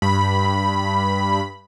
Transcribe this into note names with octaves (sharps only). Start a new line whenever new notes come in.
G2 B5